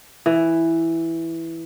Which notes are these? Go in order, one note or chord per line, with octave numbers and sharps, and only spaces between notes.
E3